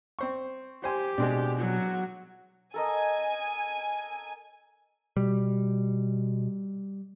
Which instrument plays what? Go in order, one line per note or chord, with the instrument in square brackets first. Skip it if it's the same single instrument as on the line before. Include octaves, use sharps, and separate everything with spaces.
[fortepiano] C4 C5 C#6
[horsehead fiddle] G4 [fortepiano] C5 G#5 C6
[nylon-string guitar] B2 [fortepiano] G#3 C4 D4
[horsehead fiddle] F#3 F#4
[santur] A4 A#4 D#5 [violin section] G#5
[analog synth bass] B2 [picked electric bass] G3